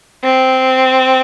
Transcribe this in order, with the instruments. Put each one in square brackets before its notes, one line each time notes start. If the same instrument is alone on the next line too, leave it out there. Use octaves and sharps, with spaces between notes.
[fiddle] C4